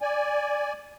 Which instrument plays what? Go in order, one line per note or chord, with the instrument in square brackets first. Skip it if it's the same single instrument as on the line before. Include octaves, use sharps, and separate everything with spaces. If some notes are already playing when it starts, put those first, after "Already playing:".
[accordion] D5 G#5